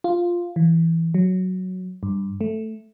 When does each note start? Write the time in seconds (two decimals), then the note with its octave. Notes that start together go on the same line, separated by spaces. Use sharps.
0.04 F4
0.56 E3
1.14 F#3
2.03 G2
2.41 A3